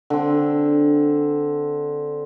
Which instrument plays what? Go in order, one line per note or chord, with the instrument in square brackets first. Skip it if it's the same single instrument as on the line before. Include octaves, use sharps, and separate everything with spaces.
[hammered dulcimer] D3 C4